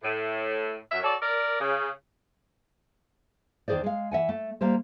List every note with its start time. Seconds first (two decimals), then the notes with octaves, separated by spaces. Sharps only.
0.03 A2
0.91 F#2 E5
1.03 F#4 A4 C#5 D5
1.22 A#4 D5
1.60 C#3
3.68 E2 D#3 F3 G#4 C5 D5
3.84 G#3 F5
4.11 E3 E5 F#5 G#5
4.29 A3
4.61 G3 A#3 G4 C5